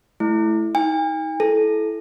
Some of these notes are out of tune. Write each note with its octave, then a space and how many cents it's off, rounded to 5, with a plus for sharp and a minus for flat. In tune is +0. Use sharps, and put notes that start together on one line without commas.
A3 -20 E4 +0
D#4 +30 G#5 -45
E4 +0 A4 -25